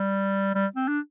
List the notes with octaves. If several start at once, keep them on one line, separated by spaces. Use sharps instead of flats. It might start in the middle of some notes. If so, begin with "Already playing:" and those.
Already playing: G3
G3
C4
D4